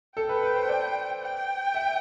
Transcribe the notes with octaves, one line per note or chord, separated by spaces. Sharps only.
A4 G5
B4
B4
C5
D5
G5
E5